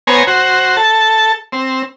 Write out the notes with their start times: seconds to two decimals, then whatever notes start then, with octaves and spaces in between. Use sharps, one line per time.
0.07 B3 C5 C#5 G#5 A#5
0.27 F#4 C5
0.77 A4 A5
1.52 C4